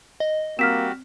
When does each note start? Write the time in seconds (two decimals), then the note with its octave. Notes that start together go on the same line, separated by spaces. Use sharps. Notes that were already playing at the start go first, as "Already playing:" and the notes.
0.20 D#5
0.59 G3 A#3 C4 F#4 G4 F6 B6 E7